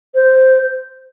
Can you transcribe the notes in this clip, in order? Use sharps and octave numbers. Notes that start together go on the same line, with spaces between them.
C5